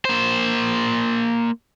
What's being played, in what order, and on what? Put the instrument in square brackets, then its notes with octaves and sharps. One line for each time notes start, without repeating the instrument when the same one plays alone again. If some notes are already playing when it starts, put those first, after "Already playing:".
[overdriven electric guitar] A#3 C5